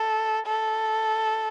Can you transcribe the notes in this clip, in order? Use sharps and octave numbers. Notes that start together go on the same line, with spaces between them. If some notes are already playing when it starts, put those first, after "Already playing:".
Already playing: A4
A4